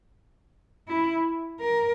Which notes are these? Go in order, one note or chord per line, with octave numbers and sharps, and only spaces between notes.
E4
A#4